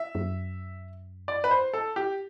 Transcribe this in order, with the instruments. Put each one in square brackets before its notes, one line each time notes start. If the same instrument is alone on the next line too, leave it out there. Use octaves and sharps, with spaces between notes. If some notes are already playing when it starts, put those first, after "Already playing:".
Already playing: [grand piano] E5
[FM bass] F#2
[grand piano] D5
B4
C5
A4
G4